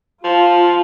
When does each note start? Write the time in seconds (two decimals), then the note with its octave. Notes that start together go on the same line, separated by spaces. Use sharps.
0.24 F3 F4